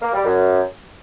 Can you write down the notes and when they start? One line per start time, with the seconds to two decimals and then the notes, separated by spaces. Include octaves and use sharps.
0.02 A#3
0.13 G3
0.25 F#2